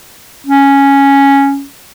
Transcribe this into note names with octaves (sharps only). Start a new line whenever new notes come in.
C#4